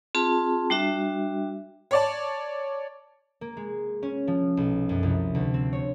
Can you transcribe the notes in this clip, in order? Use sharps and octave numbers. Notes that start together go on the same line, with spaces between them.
C4 F4 G#4 A5
G3 D4 F#4 E5
C#5 D5 A5
A#3
G#3
C#4
F3
B1
F#2
C2
D2
C4
C#5